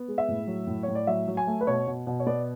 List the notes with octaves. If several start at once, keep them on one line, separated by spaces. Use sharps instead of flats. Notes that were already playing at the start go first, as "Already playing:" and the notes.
Already playing: B3
G#3
E5
A2
F#3
A2
C#5
A2
D5
F#3 E5
F#3
G#5
A3
B4
B2 C#5
B2
B2
C#5
B3 D5